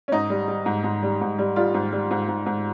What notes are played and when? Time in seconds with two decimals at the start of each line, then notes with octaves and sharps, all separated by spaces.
0.08 C#4
0.12 G#2 D#4
0.30 G3
0.48 G3
0.66 G#2
0.84 G#2
1.03 G3
1.21 G#2
1.39 G3
1.56 G3 F4
1.74 G#2
1.93 G3
2.11 G#2
2.28 G#2
2.46 G#2